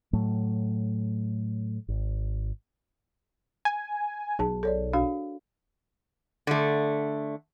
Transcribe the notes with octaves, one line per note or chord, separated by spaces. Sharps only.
A2 F#3 A3
G#1
G#5
B1 G#4 A5
A4 C#5 D5
D4 F#4 F5
D3 A3